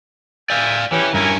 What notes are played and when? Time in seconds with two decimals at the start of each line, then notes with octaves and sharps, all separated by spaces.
0.50 D5 E5 F5 G5 G#5
0.92 E3 C#4 G4 B4
1.14 G2 C#4 E4 A#4 G#5